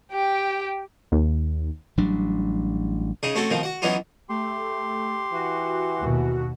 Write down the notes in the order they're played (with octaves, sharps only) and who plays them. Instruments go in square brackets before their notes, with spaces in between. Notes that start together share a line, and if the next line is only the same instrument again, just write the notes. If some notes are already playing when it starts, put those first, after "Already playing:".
[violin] G4 G5
[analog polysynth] D#2
[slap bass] A1 F#3 G3 D4
[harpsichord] C#3 D#4 G#4
A3 C4 C#4 F#4 A4
B2 D#3 F3 C4
F#4 F#5
E3 F#3 B3 C#4 D#4 F4
[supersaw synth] A3 [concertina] G4 C6
[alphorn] E3 [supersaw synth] F#4
[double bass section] D#2 B2